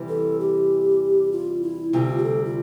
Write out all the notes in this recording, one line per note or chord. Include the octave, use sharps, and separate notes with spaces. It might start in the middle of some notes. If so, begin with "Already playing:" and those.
Already playing: E2 C3 E3 G3
A4
G4
F4
E4
D2 C3 G3 F4
G4
A4
F4